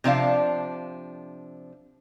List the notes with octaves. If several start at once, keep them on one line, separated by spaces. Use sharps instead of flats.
C3 F3 D4 F5